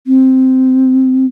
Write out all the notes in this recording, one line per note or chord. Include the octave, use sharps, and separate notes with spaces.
C4